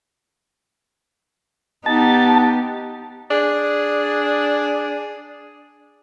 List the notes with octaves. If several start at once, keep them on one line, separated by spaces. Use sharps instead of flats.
B3 D#4 G4 A5
D4 G#4